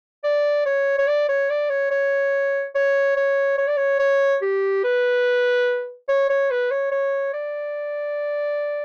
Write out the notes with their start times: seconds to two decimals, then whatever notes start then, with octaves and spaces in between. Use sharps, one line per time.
0.24 D5
0.66 C#5
0.99 C#5
1.07 D5
1.29 C#5
1.50 D5
1.70 C#5
1.91 C#5
2.75 C#5
3.17 C#5
3.58 C#5
3.68 D5
3.77 C#5
3.99 C#5
4.42 G4
4.84 B4
6.08 C#5
6.30 C#5
6.51 B4
6.71 C#5
6.91 C#5
7.34 D5